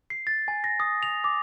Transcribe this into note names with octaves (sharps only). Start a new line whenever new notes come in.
C7
A6
G#5
A#6
D#6
F7
D6